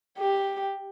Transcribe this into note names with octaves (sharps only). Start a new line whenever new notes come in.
G4